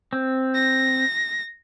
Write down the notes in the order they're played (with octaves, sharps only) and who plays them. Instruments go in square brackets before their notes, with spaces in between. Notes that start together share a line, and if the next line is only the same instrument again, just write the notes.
[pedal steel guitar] C4
[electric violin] A#6